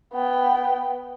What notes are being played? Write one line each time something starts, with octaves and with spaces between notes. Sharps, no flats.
B3 G5